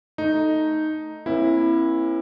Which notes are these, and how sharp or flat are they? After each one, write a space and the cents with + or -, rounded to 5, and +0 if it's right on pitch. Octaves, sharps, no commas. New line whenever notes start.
A3 +0 D#4 +0
A#3 +45 C#4 -45 E4 +0